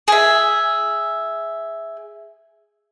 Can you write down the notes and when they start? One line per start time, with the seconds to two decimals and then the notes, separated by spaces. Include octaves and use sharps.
0.08 G#4 E5